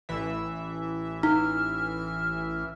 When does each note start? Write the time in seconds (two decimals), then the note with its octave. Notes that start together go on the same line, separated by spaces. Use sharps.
0.09 A1 E3 E5
1.23 D#4 F6